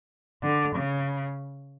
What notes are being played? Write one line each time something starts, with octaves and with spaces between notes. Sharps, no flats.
D3
C#3